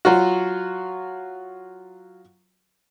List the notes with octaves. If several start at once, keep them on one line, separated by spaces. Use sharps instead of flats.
F#3 F4 F#4